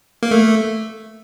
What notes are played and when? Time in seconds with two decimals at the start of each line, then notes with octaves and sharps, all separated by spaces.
0.23 A#3
0.31 A3